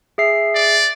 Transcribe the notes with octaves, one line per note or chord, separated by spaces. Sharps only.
G#4 E5 C7
D5